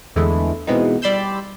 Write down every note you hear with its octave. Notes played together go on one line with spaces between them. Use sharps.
E2 D3 E3 G#3 A3 E4
B2 E3 G#3 B3 C4 D#4
G3 D5 B5 C6 E6 G6